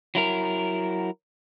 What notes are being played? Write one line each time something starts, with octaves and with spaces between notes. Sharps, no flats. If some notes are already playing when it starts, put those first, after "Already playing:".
F#3 E4 A#4